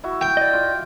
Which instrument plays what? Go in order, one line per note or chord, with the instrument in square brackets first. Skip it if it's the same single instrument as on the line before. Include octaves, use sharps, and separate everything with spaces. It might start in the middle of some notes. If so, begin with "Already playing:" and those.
[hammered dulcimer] E4 F#4 E5
[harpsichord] G5
[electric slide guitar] D5 D#5
[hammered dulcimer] F4 D6